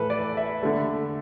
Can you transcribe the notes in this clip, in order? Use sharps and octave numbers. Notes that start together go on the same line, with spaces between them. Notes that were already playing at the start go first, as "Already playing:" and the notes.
Already playing: A2 E3 A4 B4
D5
E5
D3 A3